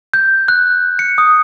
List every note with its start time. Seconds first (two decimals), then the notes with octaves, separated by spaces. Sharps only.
0.14 G6
0.48 F#6
0.99 C#7
1.18 D#6